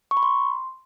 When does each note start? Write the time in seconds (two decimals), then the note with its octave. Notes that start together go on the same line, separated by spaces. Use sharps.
0.11 C#6
0.17 B5
0.23 C6